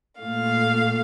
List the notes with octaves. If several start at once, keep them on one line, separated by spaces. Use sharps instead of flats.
A#2 A3 F5